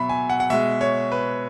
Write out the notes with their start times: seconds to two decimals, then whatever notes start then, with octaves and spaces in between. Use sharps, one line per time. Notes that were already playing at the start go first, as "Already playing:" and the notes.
Already playing: B2 F#3 E5 B5
0.09 G#5
0.30 F#5
0.40 F#5
0.50 B2 G#3 E5
0.81 C#5
1.12 B4